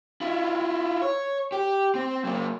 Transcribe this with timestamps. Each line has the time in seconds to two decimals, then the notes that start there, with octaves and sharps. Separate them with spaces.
0.21 E4 F4
1.02 C#5
1.52 G4
1.95 C4
2.24 F#3 A#3